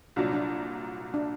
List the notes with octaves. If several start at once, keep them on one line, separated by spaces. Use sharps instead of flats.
C2 A#2 F#3 D4
D4
D4